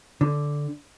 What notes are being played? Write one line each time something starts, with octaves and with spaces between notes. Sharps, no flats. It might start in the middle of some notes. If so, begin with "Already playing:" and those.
D3